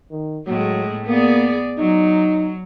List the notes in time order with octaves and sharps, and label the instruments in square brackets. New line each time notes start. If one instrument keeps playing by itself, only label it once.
[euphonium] D#3
[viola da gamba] A2 G#3 [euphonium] F#3
[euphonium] A#3 [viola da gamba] B3 G#4 D5
[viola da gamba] F#3 [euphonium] D#4